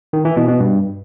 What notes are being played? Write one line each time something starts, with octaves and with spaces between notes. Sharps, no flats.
D#3
E3
B2
B2
G2